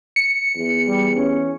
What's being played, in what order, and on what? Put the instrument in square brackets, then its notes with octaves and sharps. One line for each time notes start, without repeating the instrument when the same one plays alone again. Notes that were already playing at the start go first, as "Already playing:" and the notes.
[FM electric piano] C#7
[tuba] E2
[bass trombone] G3
C#4